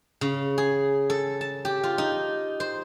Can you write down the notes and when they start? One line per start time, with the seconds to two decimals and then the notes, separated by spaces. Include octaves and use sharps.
0.21 C#3
0.58 G#4
1.10 A4
1.41 A5
1.65 G4
1.83 F4
1.98 D#4
2.60 C5